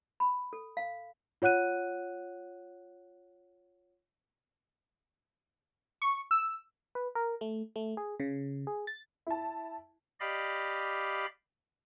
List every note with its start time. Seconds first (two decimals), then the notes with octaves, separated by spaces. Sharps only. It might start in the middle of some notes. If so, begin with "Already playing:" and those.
0.20 B5
0.53 A4
0.77 F5
1.42 F4 C#5 F#5 F#6 D#7
6.02 C#6
6.31 E6
6.95 B4
7.15 A#4
7.41 A3
7.76 A3
7.97 G#4
8.20 C#3
8.67 G#4
8.87 A6
9.27 E4 A5
10.20 G4 D5 D#5 F5 B5